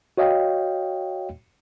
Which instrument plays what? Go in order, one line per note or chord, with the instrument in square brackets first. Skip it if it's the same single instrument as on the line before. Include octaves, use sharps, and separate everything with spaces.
[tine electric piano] F#4 C#5 D#5 F5 G5